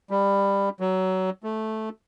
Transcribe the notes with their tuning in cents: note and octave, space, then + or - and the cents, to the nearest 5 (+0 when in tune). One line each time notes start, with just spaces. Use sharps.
G3 +20
F#3 +20
A3 -10